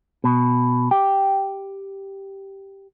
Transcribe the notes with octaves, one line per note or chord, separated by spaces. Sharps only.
B2
G4